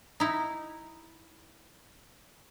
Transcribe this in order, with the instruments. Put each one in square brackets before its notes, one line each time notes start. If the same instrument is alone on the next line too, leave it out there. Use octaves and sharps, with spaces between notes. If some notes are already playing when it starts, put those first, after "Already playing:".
[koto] D#4 E4